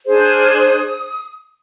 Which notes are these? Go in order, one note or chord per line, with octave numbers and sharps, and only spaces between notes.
D4 G#4 C5
G6
F6
D#6